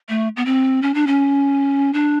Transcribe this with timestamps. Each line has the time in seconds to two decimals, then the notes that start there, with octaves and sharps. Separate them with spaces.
0.09 A3
0.37 B3
0.46 C4
0.82 C#4
0.94 D4
1.07 C#4
1.93 D4